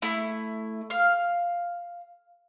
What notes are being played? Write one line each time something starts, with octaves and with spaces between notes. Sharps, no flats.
A3 E4
F5